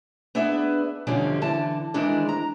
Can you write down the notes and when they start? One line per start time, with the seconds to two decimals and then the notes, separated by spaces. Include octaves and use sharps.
0.35 B3 D4 G#4 B4 E5
1.07 E2 B2 D3 F3 G3 C#4
1.42 D3 E3 A5
1.94 D#3 E3 G#3 C4 D4
2.29 A#5